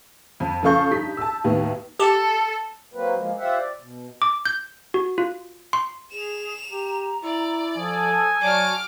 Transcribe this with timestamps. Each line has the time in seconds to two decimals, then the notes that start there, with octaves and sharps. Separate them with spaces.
0.40 F2
0.63 C#3 F3 A4 F5 C#6 G6
0.91 G2 D#4 B6
1.17 A5 E6
1.44 D#2 A2 D#3 B3
2.00 G4 A4 A5
2.94 F#3 A#3 C4 B4
3.15 F3 G#3 A#3
3.37 F4 G4 C5 E5 F#5
3.58 D5
3.80 B2
4.22 D6
4.45 G6
4.94 F#4
5.18 F4
5.73 C6
6.10 G#4 E7 F7
6.71 G4 A#5
7.23 E4 D5
7.77 F3 A4 G#5 D#6
8.41 F#3 F#4 D5 A5 D6 F6